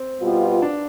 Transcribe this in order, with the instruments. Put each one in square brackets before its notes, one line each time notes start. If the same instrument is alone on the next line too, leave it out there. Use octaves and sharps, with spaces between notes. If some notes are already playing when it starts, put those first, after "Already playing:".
Already playing: [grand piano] C4
[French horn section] B2 G3 B3 F4
[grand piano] D4